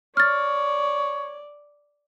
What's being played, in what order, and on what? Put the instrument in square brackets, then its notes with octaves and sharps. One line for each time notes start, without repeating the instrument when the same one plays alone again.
[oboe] C#5 [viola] D5 [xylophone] F6 A6